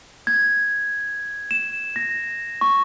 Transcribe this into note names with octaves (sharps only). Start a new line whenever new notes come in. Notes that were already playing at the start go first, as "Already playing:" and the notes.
G#6
E7
A#6
C#6